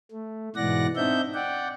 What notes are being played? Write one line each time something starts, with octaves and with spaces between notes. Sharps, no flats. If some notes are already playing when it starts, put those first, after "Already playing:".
A3
G#2 B2 E3 D5 F#5 A#6
C4 D4 D#4 E5 G6
D5 F#5 G5